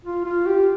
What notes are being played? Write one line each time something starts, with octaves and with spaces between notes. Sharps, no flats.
F4
F4
G4